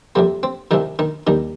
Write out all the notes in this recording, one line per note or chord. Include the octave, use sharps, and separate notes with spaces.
F2 C3 G3 A#3
C4
C2 C3 D#3 G3 D#4
D#3 D#4
D#2 D#3 G3 D#4